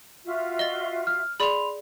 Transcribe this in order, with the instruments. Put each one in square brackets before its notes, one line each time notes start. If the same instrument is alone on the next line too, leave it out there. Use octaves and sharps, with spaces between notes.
[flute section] F4 F#4 E5
[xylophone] D#5 A6 [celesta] G7
[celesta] F6
[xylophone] G#4 D5 [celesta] B5 C6 F7